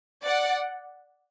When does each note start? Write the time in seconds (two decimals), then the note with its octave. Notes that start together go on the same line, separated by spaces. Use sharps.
0.25 D5 F#5